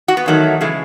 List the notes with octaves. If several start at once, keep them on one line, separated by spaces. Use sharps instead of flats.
F#4
B3
E2 D#3 F#3 A3
C#3 E3 G#3 A3